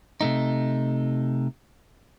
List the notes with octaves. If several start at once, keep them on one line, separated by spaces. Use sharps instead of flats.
C3 A3 D#4